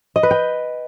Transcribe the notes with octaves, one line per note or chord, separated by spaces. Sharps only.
D#5
B4
G5